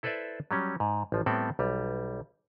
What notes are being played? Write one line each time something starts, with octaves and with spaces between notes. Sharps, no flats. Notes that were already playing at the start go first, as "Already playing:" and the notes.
E4 A4 B4 C5 D5 E5
F#3 G3 C#4
G#2
A1 F3
A2 G3 B3 C4 A4 D5
B1 G3